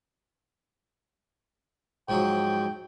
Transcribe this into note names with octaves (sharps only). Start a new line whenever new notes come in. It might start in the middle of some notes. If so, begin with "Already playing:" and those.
G#2 F3 F#3 G5